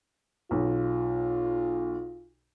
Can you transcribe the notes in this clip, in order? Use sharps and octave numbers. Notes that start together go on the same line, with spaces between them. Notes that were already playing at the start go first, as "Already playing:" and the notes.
B1 F4